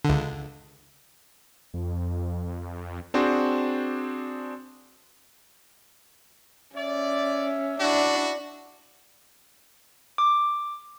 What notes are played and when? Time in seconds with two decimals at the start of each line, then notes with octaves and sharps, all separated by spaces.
0.05 C#2 D3
1.74 F2
3.14 C4 D4 F#4 G#4 C5
6.76 C#4 D5 E5
7.80 D4 E4 F#4
10.18 D6